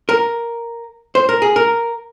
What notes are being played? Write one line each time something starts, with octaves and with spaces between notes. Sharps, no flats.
A#4
C5
A#4
G#4
A#4